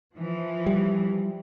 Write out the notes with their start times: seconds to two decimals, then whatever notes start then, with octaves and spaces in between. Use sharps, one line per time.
0.16 E3 F3
0.66 G3